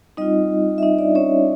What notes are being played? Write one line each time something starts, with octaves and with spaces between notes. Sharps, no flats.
G3 C4 D#4 F4 D#5
E5
D#4 D#5
D4 D5
C#4 C#5